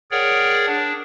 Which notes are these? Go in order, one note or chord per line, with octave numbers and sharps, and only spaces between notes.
G#4 A#4 C#5 D5 F#5 G5
D4